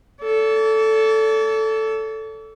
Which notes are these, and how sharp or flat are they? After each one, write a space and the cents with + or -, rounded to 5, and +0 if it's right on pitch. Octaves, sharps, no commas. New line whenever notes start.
A4 +0 D5 -45